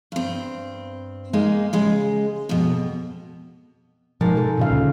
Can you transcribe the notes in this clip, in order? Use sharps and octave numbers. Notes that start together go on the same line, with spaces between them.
G2 C4
G#3 A#3 D#4
C#3 G#3 D#5
F2 B2
G#2 B2 F3 A#4 A5
A4
A#2 C#3 F5
D2